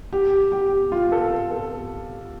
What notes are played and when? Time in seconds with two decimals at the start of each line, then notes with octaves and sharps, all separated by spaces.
0.13 G4
0.52 G4
0.92 F4
1.12 A4
1.51 A4